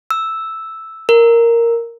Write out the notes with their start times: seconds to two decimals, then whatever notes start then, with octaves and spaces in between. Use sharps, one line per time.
0.11 E6
1.09 A#4